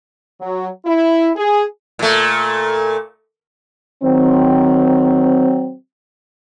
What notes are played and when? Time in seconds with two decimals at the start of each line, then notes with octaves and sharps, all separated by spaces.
0.41 F#3
0.85 E4
1.35 G#4
1.99 A#2 A3
4.03 D#3 F#3 C4